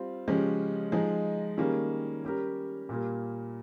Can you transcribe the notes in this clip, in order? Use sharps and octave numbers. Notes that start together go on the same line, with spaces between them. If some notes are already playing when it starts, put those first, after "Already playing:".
Already playing: G3 C4 F4
C#3 F3 G#3 C#4 G4
F3 G#3 D#4 G#4
D#3 G3 A#3 C#4 G#4
G3 C#4 G4 A#4
A#2 G3 A#3